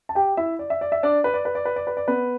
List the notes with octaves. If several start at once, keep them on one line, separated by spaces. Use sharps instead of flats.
A5
G4 G5
E4 E5
D5
E5
D5
E5
D4 D5
B4
D5
B4
D5
B4
D5
B4
D5
B3 B4